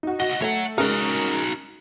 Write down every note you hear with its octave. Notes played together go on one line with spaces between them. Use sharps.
D#4 F#4
D2 F#4 D#5
A3 C#5 F#5
G#3 C#4 D#4 F#4 A#4